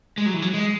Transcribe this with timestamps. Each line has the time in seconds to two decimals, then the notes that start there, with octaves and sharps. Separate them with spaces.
0.18 G#3
0.26 F#3
0.34 E3
0.42 F#3
0.54 G#3